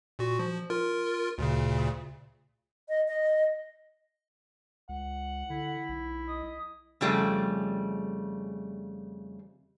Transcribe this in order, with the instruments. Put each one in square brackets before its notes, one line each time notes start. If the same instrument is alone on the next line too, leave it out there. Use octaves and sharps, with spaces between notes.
[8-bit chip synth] A#2 F#4
F3
F4 A#4
D2 A#2 C#3
[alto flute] D#5
D#5
[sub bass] C#2 [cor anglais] F#5
[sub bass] D3 [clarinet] E4
[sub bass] B1
[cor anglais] D#5
[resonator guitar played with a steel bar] F2 C#3 G3 A3